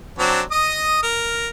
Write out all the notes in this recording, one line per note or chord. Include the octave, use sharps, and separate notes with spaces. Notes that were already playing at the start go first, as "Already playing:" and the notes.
F#3 C4 D4
D#5 D#6
A#4